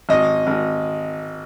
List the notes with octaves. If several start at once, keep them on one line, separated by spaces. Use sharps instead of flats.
G#1 D#5
G#1